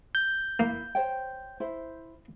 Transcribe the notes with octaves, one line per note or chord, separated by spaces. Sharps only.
G6
A#3 E4
C5 C#5 G5
E4 C5